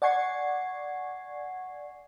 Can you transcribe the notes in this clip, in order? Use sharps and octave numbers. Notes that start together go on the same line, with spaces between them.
D5 F#5 G#5 C#6 G#6 C7